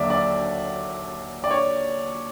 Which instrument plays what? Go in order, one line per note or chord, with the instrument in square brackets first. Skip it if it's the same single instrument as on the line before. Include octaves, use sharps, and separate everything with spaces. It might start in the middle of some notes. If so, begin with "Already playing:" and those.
Already playing: [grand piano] D#2 D3 F#3 D5 E5
D5
D5
C#5